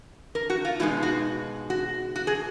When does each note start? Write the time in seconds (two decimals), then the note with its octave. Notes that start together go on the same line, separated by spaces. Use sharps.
0.35 A#4
0.50 F#4
0.65 F4
0.80 B2 G#3 D#4 F4
1.03 F#4
1.70 F#4
2.16 F#4
2.27 G#4